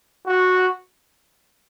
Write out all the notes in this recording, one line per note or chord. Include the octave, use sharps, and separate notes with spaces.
F#4